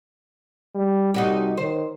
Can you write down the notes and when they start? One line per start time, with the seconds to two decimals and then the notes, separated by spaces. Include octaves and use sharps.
0.75 G3
1.14 C2 D#4 F#4 G4
1.57 D#3 C5